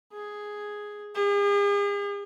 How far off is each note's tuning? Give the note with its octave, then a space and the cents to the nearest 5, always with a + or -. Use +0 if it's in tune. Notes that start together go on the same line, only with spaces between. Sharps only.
G#4 +0
G#4 -45